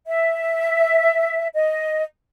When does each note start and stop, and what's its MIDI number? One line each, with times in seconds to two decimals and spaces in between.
0.07 1.47 76
1.54 2.03 75